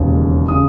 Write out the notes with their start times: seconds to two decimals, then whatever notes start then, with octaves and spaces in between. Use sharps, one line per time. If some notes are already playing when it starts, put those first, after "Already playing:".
Already playing: E1 D#2 C#3
0.48 C#3 D#6